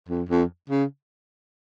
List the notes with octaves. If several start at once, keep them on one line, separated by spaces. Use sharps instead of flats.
F2
F2
C#3